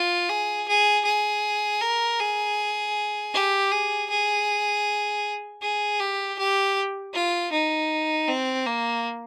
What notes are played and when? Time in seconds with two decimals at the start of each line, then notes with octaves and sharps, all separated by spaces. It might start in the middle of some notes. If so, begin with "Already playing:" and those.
Already playing: F4
0.30 G#4
0.68 G#4
1.05 G#4
1.81 A#4
2.20 G#4
3.34 G4
3.72 G#4
4.10 G#4
5.62 G#4
6.00 G4
6.39 G4
7.14 F4
7.53 D#4
8.28 C4
8.66 A#3